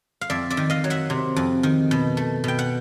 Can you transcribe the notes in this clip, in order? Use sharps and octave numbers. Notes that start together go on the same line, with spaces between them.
F5
F2 D5 E5
D5 E5
D#3
D#5 F5
F#3
E5 F#5
C3
F2
D#3
B2
A3
B2 G5
F#5